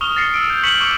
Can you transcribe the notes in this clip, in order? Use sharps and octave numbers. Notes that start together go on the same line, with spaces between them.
C#6 D#6 F6 F7 G7
F6 A6 A#6 C7 C#7 G7
E6 D7
G6
C#6 F6 B6 C#7 F#7
C#6 D6 E6 C#7